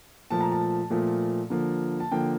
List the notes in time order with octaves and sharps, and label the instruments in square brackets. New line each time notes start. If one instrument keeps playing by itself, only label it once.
[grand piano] A#2 F3 A3 A5
A#5
A5
A#2 F3 A3
D3 F3 A#3
A5
D3 F3 A#3 G5